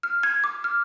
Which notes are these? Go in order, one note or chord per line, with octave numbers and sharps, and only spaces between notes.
F6
G#6
D6
F6